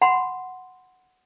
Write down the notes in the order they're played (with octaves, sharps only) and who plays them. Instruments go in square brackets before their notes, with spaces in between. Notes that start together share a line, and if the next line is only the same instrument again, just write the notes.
[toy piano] F#5 B5 C6